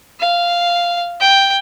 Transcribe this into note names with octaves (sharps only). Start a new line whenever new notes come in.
F5
G5